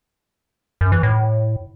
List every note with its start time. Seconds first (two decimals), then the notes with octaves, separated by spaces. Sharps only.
0.81 F#2
0.92 E3
1.03 A2